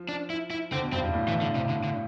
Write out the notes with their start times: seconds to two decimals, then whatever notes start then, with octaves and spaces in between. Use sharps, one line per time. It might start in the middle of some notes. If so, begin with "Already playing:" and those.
Already playing: F3
0.09 D4
0.30 E4
0.50 E4
0.72 D3 C4
0.82 B2
0.92 G2 C4
1.03 G2
1.14 A2
1.28 E3
1.41 D3
1.55 C3
1.69 D3
1.84 D3